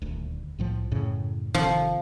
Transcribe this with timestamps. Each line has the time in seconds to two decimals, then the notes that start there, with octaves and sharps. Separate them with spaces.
0.02 D#1 D2
0.58 C2 A2 F3
0.91 F#2 A2 C#3
1.54 G1 C3 D#3 F3